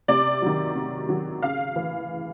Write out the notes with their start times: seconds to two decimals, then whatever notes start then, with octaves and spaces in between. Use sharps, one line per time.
0.08 C3 D5
0.42 D#3 F#3
0.76 C3
1.09 D#3 F#3
1.42 C#3 F5
1.76 E3